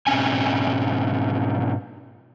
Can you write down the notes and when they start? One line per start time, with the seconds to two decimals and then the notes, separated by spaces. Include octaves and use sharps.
0.07 G#2 B2 C4 C#4 G#5